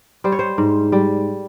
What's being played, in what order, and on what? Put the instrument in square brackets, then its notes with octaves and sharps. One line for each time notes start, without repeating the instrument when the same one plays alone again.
[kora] G3 C5
C#5
C5
G#2
G3